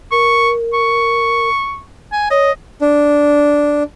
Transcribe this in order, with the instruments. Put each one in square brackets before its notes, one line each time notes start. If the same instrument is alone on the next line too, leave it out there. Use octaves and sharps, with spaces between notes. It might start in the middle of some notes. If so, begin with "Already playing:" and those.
[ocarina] A#4 [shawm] C#6
[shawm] C#6
G#5
[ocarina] C#5 [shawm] D#5
[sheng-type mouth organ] D4